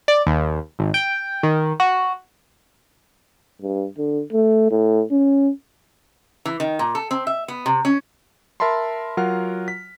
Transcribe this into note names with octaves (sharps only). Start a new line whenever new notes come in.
D5
D#2
G#1
G5
D#3
F#4
G2
D3
A3
A2
C#4
E3
D#3
A#2
A4
C4
E5
B3
C3
C#4
A#4 E5 A5 B5 C6
F#3 F4 A#4 F#5 F6
B6